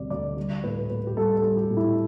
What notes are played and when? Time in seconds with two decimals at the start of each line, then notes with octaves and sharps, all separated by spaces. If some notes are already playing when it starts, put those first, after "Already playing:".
Already playing: D2 C3 G3 D5
0.10 D2 D5
0.37 G3
0.64 A2 B4
0.90 A2 B4
1.07 G4
1.17 G3 A4
1.37 A4
1.43 G3
1.57 G4
1.70 A2
1.77 E4